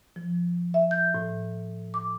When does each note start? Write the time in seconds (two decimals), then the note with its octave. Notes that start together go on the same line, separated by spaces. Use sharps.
0.16 F3
0.74 E5
0.91 G6
1.15 A2
1.94 D6